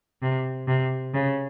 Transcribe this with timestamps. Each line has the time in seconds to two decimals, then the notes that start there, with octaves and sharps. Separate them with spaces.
0.21 C3
0.67 C3
1.13 C#3